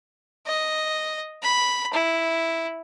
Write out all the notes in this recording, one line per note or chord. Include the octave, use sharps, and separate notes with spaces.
D#5
B5
E4